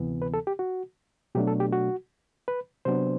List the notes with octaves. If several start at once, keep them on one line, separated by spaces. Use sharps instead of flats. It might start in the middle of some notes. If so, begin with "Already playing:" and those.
Already playing: D2 C3 E3 B3
B4
A4
G4
F#4
B2 F#3 A3 D4 G4
A4
G4
F#4
B4
C3 F#3 B3 D4 C5